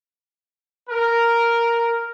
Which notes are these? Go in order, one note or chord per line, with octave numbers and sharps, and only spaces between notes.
A#4